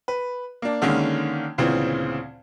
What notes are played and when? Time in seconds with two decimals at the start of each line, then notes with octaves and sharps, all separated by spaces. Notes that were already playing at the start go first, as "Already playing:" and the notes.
0.08 B4
0.62 A#3 D4
0.82 D3 D#3 G#3 A#3 C#4
1.58 D2 A#2 C#3 E3 C4